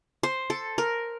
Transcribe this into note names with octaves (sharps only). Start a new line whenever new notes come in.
C5
A4
A#4